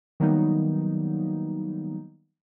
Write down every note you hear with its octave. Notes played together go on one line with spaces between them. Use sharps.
D#3 F#3 G3 A#3 B3 D#4